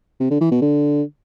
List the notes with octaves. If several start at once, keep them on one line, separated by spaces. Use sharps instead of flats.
C3
D3
E3
B2
D3